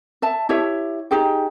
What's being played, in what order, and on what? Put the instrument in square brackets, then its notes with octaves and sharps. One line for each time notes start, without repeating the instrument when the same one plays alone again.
[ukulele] E5 A5
E4 G4 C#5 E5
D#4 G4 G#4 G5